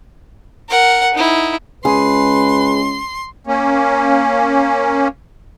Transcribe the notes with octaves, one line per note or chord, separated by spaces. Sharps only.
A#4 F#5
D#4 E4
C#2 G#4 B4 C6
A#3 C#4